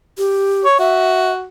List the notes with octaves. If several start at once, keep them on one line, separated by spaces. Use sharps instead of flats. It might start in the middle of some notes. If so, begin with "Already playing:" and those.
G4
C#5
F#4 E5